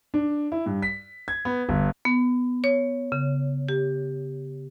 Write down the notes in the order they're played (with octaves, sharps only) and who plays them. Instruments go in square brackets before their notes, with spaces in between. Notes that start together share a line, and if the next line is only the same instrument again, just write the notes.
[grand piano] D4
E4
G2
B6
G#6
B3
G1
[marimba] B3
C#5
C#3
G4